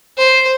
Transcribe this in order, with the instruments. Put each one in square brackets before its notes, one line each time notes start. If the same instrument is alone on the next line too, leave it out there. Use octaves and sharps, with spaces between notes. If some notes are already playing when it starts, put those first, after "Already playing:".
[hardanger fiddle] C5